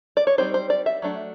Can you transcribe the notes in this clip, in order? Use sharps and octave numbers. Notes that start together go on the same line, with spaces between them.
D5
C#5
G3 C4 D#4 C5
C5
D5
E5
F#3 A3 D4